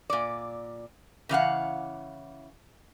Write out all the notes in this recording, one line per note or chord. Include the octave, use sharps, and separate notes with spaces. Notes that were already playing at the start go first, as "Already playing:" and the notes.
A#2 D5
C#3 E3 F5 F#5